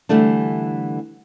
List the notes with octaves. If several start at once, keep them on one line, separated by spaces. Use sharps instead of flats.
D3 E3 G3 A3 D4